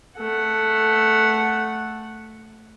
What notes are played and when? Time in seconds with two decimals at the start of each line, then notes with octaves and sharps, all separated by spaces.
0.18 A3 F#5